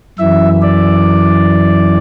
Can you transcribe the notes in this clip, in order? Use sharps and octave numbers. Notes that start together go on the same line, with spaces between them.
F#2 E3 E5
D5